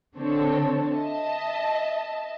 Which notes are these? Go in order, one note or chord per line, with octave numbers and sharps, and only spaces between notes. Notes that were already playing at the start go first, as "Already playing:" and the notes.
D3 C4 A4 C#5
D#5 E5 A5